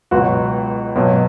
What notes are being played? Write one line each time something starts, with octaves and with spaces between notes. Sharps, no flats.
C#2 B2 F#3 F#4
B1 B2 F#3